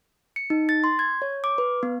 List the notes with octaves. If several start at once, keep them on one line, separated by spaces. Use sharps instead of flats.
C#7
D#4
A6
C6
G#6
C#5
D6
B4
B3